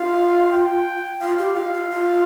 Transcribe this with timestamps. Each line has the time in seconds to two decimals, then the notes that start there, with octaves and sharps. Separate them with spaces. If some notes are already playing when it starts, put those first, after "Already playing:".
Already playing: F4 F5
0.51 G5
1.21 F4 F5
1.39 G4
1.55 F4 F5
1.73 F4
1.91 F4